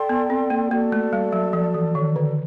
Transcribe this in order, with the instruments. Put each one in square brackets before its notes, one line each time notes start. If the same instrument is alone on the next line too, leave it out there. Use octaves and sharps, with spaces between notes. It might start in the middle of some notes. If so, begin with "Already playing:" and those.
Already playing: [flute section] A4 D5 G5 C6
[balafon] B3
C4
A#3
[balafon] A#3 [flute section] F#4 A4 D5
[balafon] A3
G3
F#3
F3
E3
D#3
D3